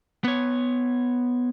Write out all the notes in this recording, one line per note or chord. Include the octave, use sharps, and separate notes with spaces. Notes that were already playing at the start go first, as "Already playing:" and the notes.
B3 C#5